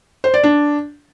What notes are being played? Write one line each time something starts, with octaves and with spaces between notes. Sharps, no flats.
C5
D5
D4